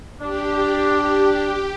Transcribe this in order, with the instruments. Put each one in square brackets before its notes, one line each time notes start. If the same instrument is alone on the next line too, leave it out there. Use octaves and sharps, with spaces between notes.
[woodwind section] D4 [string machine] G4